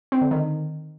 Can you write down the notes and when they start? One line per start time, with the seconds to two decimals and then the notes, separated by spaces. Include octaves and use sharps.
0.12 C4
0.22 D3
0.31 D#3